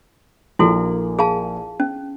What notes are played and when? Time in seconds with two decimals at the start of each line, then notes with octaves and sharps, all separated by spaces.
0.59 A#1 A#3 E4 F#4 A4
1.19 G#4 F5 A5
1.80 C#4